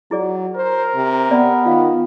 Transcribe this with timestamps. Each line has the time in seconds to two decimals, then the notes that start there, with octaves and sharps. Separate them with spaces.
0.11 F#3 E4 G#4 D5
0.55 A#4 C5
0.95 C3
1.31 B3 D5
1.65 D#3 F4 F5